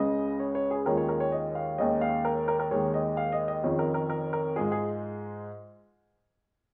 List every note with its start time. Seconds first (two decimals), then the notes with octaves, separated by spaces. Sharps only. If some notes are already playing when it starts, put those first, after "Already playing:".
Already playing: C#2 C#3 G#3 D#5
0.40 C#5
0.55 C#5
0.71 G#4
0.85 D#2 D#3 G#3 C#4 F4 A#4
0.97 C#5
1.09 A#4
1.20 C#5
1.32 D#5
1.55 F5
1.78 D#2 D#3 G#3 C#4 D#5
2.01 F5
2.25 A#4
2.48 A#4
2.60 A#4
2.71 D#2 D#3 G#3 C#5
2.94 D#5
3.17 F5
3.32 D#5
3.48 D#5
3.64 F2 D#3 C#4 F4 G#4
3.79 A#4
3.94 A#4
4.10 A#4
4.33 A#4
4.56 G#2 G#3 F4 G#4
4.72 G#4